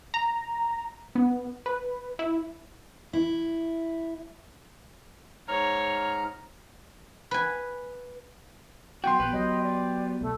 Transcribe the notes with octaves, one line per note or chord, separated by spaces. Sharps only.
A#5
B3
B4
E4
E4
G#2 C#5 A#5 F6
B4 G#5
F#3 B3 F#4 G5 C6
A#1 B3 G4 B4
F#3 D#5
D5
B1 A3